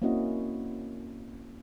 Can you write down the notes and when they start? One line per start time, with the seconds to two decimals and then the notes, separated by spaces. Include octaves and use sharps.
0.02 A#3 C4 C#4 E4 F#4 D#5